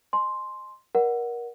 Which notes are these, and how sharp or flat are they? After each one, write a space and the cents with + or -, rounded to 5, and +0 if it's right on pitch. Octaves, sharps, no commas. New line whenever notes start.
D#5 -45 G#5 +35 C6 +0
A#4 +25 D5 +0 F#5 +0